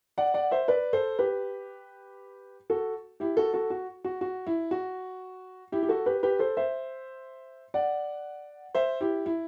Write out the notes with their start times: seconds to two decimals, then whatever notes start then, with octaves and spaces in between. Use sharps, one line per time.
0.18 D5 F#5
0.34 D5 F#5
0.51 C5 E5
0.68 B4 D5
0.93 A4 C5
1.19 G4 B4
2.70 F#4 A4
3.20 E4 G4
3.37 F#4 A4
3.54 F#4 A4
3.70 F#4
4.05 F#4
4.21 F#4
4.47 E4
4.71 F#4
5.72 E4 G4
5.83 G4
5.89 F#4 A4
6.06 G4 B4
6.23 G4 B4
6.39 A4 C5
6.57 C5 E5
7.74 D5 F#5
8.75 C5 E5
9.01 E4 G4
9.26 E4